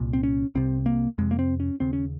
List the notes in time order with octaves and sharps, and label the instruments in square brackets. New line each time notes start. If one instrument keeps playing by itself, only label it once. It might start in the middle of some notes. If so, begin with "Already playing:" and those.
Already playing: [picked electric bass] C2 A#2
C4
C#4
C2 C3 C4
A#3
F2 C3 G#3
A#3
C4
C#4
D#2 C#3 C4
C#4